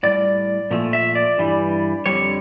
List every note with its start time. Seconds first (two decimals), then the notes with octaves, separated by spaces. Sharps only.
0.03 A2 G3 D5
0.71 A#2 F3 A3
0.93 E5
1.15 D5
1.38 G2 E3 G3
2.06 F2 D3 G3 C#5